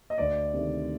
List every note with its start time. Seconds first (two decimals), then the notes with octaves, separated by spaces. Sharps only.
0.10 D#5
0.18 D2 D5
0.54 C3 D#3 A3